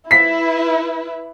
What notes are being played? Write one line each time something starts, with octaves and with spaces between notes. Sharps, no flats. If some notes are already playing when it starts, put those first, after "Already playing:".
E4 B4 B6